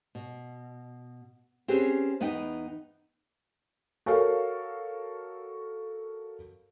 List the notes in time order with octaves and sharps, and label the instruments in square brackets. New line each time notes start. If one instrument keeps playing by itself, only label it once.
[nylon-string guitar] B2
C4 C#4 G4 G#4 B4 C#5
E2 B3 D#4 D#5 G5
[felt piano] F#4 A4 A#4 C#5 F5